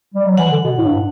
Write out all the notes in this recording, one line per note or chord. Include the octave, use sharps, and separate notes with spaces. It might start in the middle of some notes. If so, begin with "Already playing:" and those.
G3
F#3
E3 F#5
D3
B2
A2
G2